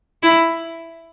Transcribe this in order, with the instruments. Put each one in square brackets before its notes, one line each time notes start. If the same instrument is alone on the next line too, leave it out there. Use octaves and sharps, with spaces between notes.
[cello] E4